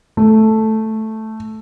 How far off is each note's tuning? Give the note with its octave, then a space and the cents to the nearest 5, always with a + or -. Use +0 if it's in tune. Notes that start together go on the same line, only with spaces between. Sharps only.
A3 +0